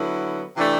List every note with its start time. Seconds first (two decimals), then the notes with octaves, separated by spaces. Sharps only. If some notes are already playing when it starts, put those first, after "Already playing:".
Already playing: D3 F#3 B3 E4
0.57 C3 E3 A3 D4